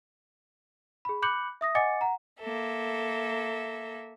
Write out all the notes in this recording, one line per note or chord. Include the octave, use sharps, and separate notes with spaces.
G#4 B5
B5 D6 F#6 G6 C#7 F#7
E5 D#6 A#6
D#5 F#5 G#5 D6 A6 C#7
F#5 A#5
A#3 A4 E5